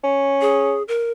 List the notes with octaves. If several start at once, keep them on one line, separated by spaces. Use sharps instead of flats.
C#4
G#4
A#4